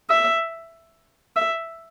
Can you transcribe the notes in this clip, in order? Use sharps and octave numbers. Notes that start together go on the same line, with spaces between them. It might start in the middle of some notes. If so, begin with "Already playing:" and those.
E5
E5